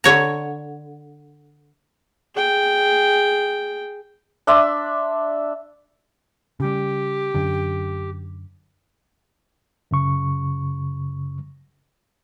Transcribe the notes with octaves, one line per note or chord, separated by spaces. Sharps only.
D3 C#5 A#5
G#4 G5
D4 E5 C6
C#3 G3 G4
F#2 D3
F#2 C#3 C#6